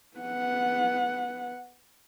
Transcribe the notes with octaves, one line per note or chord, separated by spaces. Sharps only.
B3 F#5